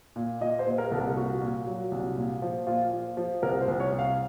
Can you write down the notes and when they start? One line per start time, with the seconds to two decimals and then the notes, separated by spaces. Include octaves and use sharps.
0.16 A#2
0.41 A#2 D#5
0.59 C5
0.67 A#2
0.78 A#4
0.91 C2 A4
0.97 A#4
1.16 A#2 F#4
1.41 A#2
1.66 F#3
1.91 C2
2.17 A#2
2.42 F3
2.67 A#2 F4
2.92 F3
3.17 F3
3.43 C2 A#4
3.61 C5
3.68 C2
3.80 C#5
3.92 C2
3.99 F5